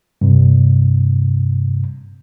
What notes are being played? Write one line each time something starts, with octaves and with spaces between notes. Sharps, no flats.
G2 C3